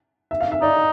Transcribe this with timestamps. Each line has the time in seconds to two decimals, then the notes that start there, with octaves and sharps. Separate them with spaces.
0.31 E5
0.41 F5
0.52 E5
0.62 D#4 D5